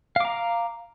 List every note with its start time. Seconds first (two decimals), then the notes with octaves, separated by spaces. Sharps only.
0.16 F5
0.20 D6
0.25 A#5